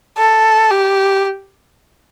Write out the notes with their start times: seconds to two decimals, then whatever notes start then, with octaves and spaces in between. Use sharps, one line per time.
0.18 A4
0.71 G4